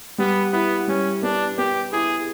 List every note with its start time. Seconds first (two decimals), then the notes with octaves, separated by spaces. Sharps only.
0.18 G3 B3
0.53 B3 E4
0.88 G3 C#4
1.23 B3 D4
1.58 B3 G4
1.92 E4 G#4